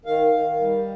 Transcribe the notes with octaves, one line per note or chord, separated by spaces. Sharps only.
D#3 F5
D#3
G3